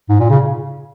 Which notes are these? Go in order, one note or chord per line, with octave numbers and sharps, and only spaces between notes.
G#2
A#2
C#3